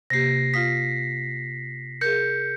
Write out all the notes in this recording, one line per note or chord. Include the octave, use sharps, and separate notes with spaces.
C3 A#3 G4 A#6 C7
F4 F5 D#6 B6
G#4 A#4 G6 C#7